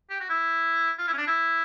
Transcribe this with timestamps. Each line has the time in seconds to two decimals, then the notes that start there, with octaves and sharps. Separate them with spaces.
0.10 G4
0.20 F#4
0.29 E4
0.98 F4
1.08 E4
1.13 C#4
1.18 D4
1.27 E4